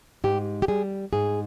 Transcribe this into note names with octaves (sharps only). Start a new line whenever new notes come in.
G#2 G4
G4
G3 G#4
G#2 G#4